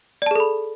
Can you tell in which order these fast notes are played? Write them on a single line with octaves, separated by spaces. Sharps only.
D5 A5 G#4 A4 B5